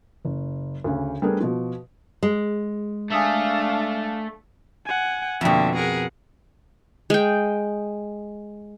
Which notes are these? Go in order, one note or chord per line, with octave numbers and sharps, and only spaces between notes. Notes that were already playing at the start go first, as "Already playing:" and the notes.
F#1
D2 C#3
G3 A3 B3 D4 G#4 A#4
B2 F3
G#3
A3 D4 F5 G#5 D#6 E6
F#5 G#5
F2 B2 D3 A#3 E5
G#4 A#4 F#5
G#3 G5